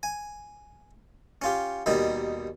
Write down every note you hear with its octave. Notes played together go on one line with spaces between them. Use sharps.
G#5
C#4 F4 G4
D#2 B2 G3 D#4